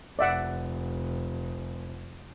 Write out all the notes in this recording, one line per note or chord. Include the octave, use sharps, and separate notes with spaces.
F1 D5 E5 F#5